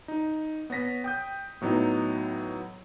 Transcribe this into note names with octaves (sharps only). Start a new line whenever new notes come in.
D#4
B3 C#5 A#6 B6
G5 D#6 G6
A2 F#3 B3 D#4